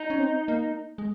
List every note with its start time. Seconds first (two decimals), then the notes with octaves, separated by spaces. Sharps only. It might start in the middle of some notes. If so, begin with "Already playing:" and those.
Already playing: D#4
0.10 C#4
0.19 C4
0.48 A#3
0.98 G#3